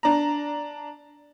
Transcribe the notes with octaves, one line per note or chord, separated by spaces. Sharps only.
D4 A#5